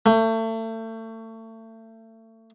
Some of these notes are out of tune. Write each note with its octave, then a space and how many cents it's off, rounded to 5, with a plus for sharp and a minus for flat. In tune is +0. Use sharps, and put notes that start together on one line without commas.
A3 +30